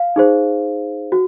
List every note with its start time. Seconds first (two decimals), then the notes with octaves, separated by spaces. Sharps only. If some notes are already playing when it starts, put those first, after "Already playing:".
Already playing: F5
0.16 D#4 G#4 C5
1.12 F#4